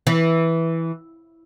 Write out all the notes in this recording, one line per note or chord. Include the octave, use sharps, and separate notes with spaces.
E3